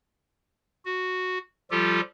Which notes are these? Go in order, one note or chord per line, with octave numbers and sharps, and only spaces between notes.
F#4
F3 G3 F4 G4 A4